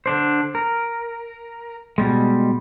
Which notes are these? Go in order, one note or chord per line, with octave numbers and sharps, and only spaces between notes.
D3 D4 C5
A#4
B2 G3 G#3